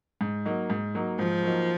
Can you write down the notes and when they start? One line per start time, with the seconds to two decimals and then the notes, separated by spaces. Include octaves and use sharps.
0.21 G#2
0.45 F#3 A#3 D#4
0.70 G#2
0.95 F#3 A#3 D#4
1.19 G#2 F3
1.43 F#3 A#3 D#4